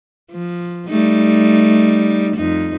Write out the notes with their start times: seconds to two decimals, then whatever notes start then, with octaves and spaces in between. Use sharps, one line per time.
0.31 F3
0.89 G3 A3 D#4
2.37 F2 D#4